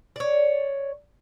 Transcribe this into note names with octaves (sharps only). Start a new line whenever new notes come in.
C#5 D5